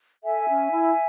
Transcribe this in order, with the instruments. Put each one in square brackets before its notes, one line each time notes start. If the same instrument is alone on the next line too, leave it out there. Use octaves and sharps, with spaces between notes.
[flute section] A4 E5 G#5
C#4
E4